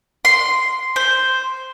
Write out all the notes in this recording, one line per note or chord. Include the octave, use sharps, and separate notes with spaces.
C6
C5